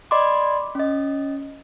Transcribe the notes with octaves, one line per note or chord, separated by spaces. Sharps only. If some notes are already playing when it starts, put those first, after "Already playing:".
D5 D#5 B5 C6 D6
C#4 D#5